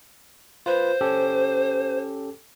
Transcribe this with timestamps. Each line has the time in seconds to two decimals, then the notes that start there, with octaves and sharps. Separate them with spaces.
0.66 F4 B4 C5
1.01 C#4 G4 A4